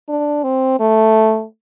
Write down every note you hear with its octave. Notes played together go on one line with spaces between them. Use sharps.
D4
C4
A3